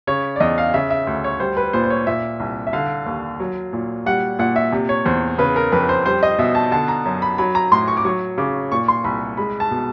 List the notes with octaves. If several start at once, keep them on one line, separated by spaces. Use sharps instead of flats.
C#3 C#5
D5
E2 D#5
F5
C#3 E5
E5
D2
C#5
G3 C5
B4
A#2 C5
C5
C#5
A#2 E5
C2
E5
D3 F5
D#2
F#3
A#2
G3 F#5
A#2 F#5
E5
C3
C#5
E2 C5
C#3 B4
A#4
F2 B4
C5
G3 C5
D#5
B2 E5
A5
D3 A5
A#5
F#2
B5
F#3 B5
A#5
A2 C6
C#6
D6
F#3 C#6
C#3 D6
A#2 C#6
C6
C2 B5
G#3 B5
A5
B2